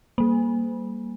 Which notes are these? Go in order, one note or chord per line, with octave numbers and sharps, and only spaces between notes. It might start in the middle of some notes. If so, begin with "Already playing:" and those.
G3 A#3